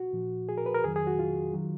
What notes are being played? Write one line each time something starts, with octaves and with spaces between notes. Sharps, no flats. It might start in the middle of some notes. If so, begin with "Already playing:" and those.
Already playing: F#4
A#2 F3
G#4
A#4
B4
A#4
F2 D#3 F#3 G#4
G#4
F#4
F4
D#3 F#3